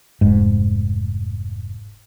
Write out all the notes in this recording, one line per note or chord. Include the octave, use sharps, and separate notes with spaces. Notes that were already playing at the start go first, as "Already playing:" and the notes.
F1 G#2